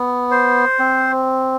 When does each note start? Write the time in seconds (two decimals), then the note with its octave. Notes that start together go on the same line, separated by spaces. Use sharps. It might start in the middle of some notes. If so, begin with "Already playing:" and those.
Already playing: B3
0.31 C5
0.79 C4